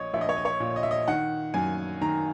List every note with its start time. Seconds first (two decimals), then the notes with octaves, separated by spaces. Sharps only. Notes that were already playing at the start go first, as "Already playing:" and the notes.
Already playing: A#1 C#5 D#5
0.13 A#1 E5
0.21 D#5
0.29 C#5
0.36 D#5
0.45 C#5
0.60 A#2
0.76 D#5
0.83 E5
0.91 D#5
1.08 D#3 F#5
1.54 F#2 G#5
2.01 D#3 A#5